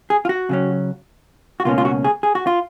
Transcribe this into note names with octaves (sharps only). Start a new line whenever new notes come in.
G#4
F4
F#4
C#3 F#3 C#4
F#4
C#2 B2 A#3 C#4 F4
F4
F#4
G#4
G#4
F#4
F4